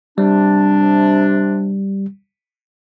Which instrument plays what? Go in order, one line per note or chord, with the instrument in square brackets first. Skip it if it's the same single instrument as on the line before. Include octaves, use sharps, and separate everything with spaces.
[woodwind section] C3 D4 [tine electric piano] G3